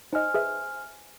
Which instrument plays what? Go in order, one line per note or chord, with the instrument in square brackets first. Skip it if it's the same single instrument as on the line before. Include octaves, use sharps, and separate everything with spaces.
[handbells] D#4 D#5 [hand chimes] C5 G#5 F6
[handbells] G#4 B4 E5